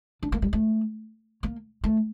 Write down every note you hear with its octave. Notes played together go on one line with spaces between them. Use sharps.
D4
A#3
G3
A3
A#3
A3